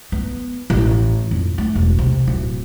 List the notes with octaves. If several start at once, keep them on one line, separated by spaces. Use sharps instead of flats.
B3
A1
F2
A3
E1
C3
D1